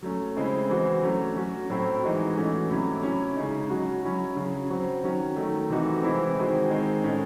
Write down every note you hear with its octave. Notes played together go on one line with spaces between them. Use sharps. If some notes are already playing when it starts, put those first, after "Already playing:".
F#3 A3 C#4
C#3 G#3 C4 E4
E3 C4 F#4
F#3 A3 C#4
F#3 C#4 F#4
A2 F#3 C4 E4
E3 G#3 D#4 F#4
E3 A3 C#4 F#4
C3 F#3 A3 C#4 E4
F#3 C#4 E4
C#3 G#3 D#4
F#3 C#4 F#4
F#3 C#4 E4
C#3 F#3 C#4
F#3 C4 F#4
D#3 F#3 C#4 F#4
D#3 F#3 A3
C3 E3 A3 D#4 F#4
E3 G#3 C4 E4
D#3 G#3 C4 F#4
D#3 G#3 C4
A2 G#3 C#4